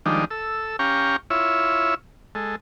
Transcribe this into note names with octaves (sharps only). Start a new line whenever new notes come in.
D#3 F3 G3 G#3 D4 D#4
A4 E6
C#4 G4 F5 G5 A#5 C#6
E4 F4 C#5 E5
G#3 A4